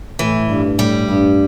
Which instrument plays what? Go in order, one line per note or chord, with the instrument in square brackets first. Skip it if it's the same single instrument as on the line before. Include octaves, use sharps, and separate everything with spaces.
[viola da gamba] A2 [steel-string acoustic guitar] E3
[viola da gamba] G2
[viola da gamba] A2 [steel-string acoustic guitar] G3
[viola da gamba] G2